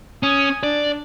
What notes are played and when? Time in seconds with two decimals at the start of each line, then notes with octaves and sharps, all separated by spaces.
0.23 C#4 G#5 D#6
0.63 D4 D5